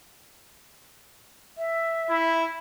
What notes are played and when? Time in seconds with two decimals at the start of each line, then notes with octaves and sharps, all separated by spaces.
1.58 E5
2.10 E4